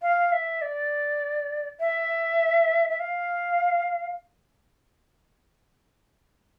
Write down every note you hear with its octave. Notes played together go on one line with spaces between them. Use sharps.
F5
E5
D5
E5
E5
F5